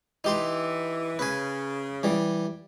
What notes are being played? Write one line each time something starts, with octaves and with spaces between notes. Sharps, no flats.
E3 D#4 G4 C6
C#3 B4 G#5
E3 G3